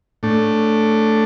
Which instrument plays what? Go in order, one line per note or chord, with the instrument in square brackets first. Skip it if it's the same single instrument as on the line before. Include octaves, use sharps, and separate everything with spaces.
[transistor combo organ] A2 A3 D4